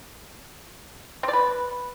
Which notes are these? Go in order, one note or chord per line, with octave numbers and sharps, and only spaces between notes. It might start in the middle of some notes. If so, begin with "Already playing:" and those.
C4
D5
B4